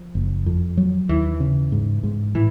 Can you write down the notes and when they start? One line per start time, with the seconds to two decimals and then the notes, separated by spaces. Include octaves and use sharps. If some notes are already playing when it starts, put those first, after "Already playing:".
Already playing: F3
0.15 F#1
0.46 F2
0.77 F#3
1.09 D#2 E3
1.40 C#3
1.72 G#2
2.03 G#2
2.35 A2 E3